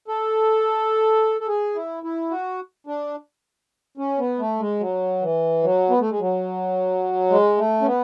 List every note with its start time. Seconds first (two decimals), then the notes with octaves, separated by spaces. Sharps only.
0.08 A4
1.41 A4
1.47 G#4
1.75 E4
2.03 E4
2.31 F#4
2.87 D4
3.97 C#4
4.19 B3
4.39 A3
4.60 G#3
4.80 F#3
5.22 E3
5.63 F#3
5.90 B3
6.00 A3
6.10 G#3
6.20 F#3
7.30 G#3
7.58 A3
7.82 C#4
7.86 B3